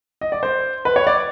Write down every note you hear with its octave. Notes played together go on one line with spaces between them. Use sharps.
D#5
D5
C5
B4
C#5
D5